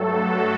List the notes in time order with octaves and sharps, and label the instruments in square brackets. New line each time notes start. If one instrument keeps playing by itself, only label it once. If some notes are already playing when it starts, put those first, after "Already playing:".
Already playing: [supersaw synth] G2 F#3 A3 A4
F#4